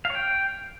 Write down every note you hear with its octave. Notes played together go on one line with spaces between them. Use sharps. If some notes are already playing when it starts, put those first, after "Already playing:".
F5
C#5
G5